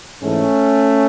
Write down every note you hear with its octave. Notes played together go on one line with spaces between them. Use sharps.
G#2 E3 A3 C#4